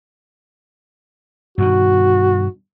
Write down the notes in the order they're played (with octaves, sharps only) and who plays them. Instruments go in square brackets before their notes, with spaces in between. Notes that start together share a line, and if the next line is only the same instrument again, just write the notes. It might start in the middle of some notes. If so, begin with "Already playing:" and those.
[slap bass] G2 B2 D#3 [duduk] F#4